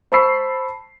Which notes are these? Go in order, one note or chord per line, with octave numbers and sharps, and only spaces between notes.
C5 A5 B5 C#6 E6 C7